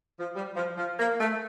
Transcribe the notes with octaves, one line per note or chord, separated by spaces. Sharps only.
F3
G3
F3
F3
A#3
A3